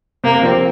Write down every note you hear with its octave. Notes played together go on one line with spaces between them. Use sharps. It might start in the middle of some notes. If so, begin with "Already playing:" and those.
C3 A#3
F3 C4 G4